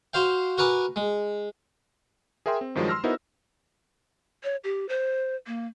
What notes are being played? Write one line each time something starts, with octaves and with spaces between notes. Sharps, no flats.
F#4 C5 F5 G5
F#4 A#4 B4 G#5 D6
G#3
G#4 A#4 E5 G5 C6
C4
G2 D#3 F3 F#3 G#3
C6 E6 F6 A#6
B3 D#4 E4 F#4 A#4 C5
C#5
G4
C5
A#3